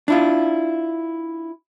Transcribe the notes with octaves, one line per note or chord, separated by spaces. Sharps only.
D4 E4 F4